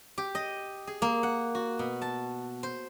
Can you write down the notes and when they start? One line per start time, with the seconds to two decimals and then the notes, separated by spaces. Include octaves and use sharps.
0.18 G4
0.35 D#5
0.87 G#4
1.02 A#3
1.23 F#5
1.55 F#4
1.79 B2
2.02 A5
2.63 C5